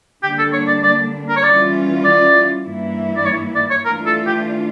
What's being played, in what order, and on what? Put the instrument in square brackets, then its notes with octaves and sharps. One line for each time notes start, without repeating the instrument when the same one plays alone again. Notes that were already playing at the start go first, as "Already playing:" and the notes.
[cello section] D3 G3 A#3 D4 [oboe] G4
[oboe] A4
C#5
D5
D5
A#4
C#5
[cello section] E3 G3 C#4 F4 [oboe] D5
[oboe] D5
[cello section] G2 E3 A#3 E4
[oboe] D5
C#5
D5
C#5
[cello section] E3 A3 D4 F4 [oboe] A#4
[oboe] A4
G4